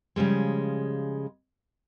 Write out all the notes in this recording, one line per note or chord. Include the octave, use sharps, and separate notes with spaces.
C#3 F3 G3 G#3